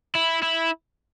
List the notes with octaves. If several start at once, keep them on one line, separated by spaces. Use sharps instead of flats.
E4
E4